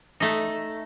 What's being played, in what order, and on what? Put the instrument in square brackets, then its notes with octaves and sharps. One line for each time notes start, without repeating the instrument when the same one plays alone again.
[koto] A3 D#4